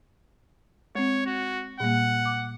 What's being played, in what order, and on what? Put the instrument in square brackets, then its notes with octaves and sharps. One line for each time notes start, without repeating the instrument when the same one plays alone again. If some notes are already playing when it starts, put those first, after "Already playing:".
[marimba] G#3 C4 [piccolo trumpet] C#5
[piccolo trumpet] F#4
[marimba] A#2 G3 A#3 [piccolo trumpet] F#5
[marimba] D6